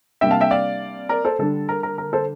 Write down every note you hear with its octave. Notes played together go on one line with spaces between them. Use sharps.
C3 G3 A#3 D4 E5 G5
F5 A5
E5 G5
D5 F5
A#4 D5
A4 C5
D3 G3 D4 A4
A#4
A#4
A#4
A4 C5